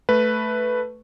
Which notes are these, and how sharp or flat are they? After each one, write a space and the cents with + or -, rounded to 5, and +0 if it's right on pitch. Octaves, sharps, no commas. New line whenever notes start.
A3 +0 B4 +0